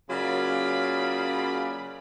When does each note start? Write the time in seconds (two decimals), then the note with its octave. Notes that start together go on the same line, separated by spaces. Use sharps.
0.10 C#3 F#3 A#3 F4 D5 B5